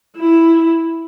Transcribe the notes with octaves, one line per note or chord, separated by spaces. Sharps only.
E4